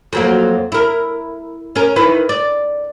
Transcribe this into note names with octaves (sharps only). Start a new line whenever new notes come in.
F2 F#3 A#3
E4 A#4
C#4 A#4
D#3 E4 B4
D5